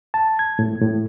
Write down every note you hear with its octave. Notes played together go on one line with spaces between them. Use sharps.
A5
G#6
A2
A2